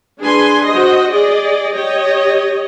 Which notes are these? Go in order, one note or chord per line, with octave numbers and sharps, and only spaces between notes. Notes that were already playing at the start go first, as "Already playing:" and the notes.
D4 G#4 B4 G#5 C6
F#4 C5 D#5
G#4 D5 D#5
G4 C#5 D#5